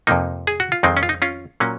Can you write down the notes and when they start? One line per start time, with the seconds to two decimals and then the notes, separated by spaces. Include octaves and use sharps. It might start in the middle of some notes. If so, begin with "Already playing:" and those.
0.07 F2 C3 F3 A#3 D#4
0.47 G#4
0.60 F#4
0.72 F4
0.83 F2 D#3 G#3 C4 D#4
0.97 C#4
1.03 F4
1.09 D#4
1.22 C#4 F4
1.60 A#2 F#3 A#3 C#4